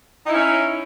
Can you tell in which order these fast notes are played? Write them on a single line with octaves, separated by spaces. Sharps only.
D#4 E4 C#4